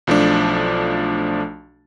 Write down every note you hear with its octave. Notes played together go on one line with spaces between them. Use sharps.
B1 F3 A3 D4